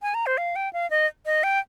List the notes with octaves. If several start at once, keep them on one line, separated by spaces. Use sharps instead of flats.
G#5
A#5
C5
F5
G5
F5
D#5
D#5
G5